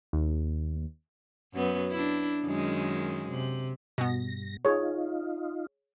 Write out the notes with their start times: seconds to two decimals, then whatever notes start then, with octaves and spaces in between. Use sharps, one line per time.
0.13 D#2
1.54 F#2 F#3 B3
1.91 D4 E4
2.46 F#2 D#3 G#3
3.30 C3
3.98 G2 B2 B3 A#6
4.65 D#4 F4 G#4 C#5